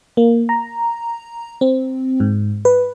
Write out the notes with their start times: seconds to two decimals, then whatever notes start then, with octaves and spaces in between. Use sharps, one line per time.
0.17 A#3
0.49 A#5
1.61 C4
2.20 G#2
2.65 B4